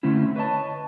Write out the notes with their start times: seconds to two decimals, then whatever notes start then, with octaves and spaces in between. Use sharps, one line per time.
0.03 D3 A3 C4 C#4 E4
0.36 B4 C#5 D#5 A5